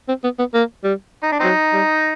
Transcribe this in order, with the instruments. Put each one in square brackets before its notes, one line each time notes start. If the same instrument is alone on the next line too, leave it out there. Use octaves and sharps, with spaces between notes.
[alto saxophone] C4
B3
B3
A#3
G3
[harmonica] D#4
D4
[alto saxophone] F#3 [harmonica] C4 D#4
[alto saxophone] G3